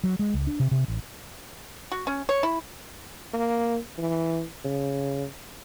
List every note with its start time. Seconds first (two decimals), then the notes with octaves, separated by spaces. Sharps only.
0.04 F#3
0.19 G#3
0.34 C#2
0.47 D4
0.60 C3
0.71 C3
0.88 A1
1.92 F#4
2.07 C#4
2.29 C#5
2.43 E4
3.34 A#3
3.98 E3
4.64 C#3